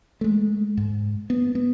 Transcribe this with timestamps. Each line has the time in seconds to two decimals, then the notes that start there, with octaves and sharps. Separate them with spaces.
0.21 A3
0.24 G#3
0.77 G#2
1.30 B3
1.55 B3